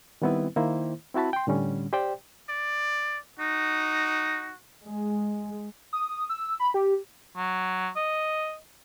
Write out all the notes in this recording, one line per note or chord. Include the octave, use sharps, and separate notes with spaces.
D#3 G3 B3 C4 E4 B4
D#3 A#3 E4 C5
C4 E4 F#4 A5 B5
G5 C6
A2 D3 G3 C#4
G4 C5 D5 G5
D5
D#4 F#4
G#3
D#6
E6
B5
G4
F#3
D#5